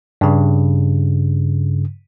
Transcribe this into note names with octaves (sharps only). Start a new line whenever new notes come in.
G2 C#3